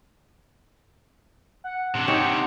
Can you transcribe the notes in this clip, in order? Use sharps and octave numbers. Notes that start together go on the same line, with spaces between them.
F#5
C3 D4
D#4 G4 C#5